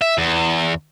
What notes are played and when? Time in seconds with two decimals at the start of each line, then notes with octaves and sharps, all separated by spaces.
0.01 E5
0.18 E2